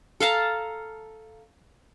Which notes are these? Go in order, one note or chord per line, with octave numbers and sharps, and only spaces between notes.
A4 F5 A5 A#5